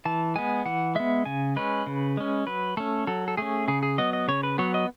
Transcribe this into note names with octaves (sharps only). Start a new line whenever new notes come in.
E3 A5
G#3 B3 G#5
E3 F#5
G#3 B3 E5
C#3 G#5
G#3 C#4 B4
C#3
G#3 C#4
F#3 B4
A3 C#4 A4
F#3 A4
A4
A3 C#4 G#4
C#3 G#4
G#4
F#3 B3 D#5
D#5
C#3 C#5
B4
F#3 B3 C#5
D#5